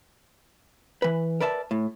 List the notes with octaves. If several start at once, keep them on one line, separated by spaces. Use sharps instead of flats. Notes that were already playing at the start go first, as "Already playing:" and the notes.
E3 B4
A#4 B4 D5 E5 A5
A2